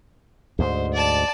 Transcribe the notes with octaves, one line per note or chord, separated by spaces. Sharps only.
D2 G#2 C5
D5 A5